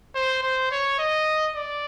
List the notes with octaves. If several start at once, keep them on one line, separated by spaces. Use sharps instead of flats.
C5
C5
C#5
D#5
D5